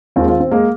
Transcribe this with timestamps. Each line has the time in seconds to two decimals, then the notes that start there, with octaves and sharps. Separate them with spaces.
0.16 D#2 D#3 G#3 C4 F4
0.28 C4 F4
0.40 C4
0.51 G#3 A#3